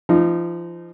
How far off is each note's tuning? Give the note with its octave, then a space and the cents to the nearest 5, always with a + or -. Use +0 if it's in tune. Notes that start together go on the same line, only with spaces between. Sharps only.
F3 -30 D#4 -15